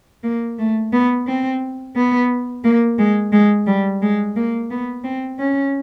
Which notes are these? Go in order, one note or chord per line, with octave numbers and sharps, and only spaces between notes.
A#3
A3
B3
C4
B3
A#3
G#3
G#3
G3
G#3
A#3
B3
C4
C#4